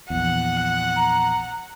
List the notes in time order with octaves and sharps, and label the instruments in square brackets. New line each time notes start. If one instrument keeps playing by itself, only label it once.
[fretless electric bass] A#1 E2 [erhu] F#5
[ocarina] A#5